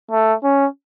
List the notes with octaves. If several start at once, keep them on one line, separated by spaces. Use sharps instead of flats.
A3
C#4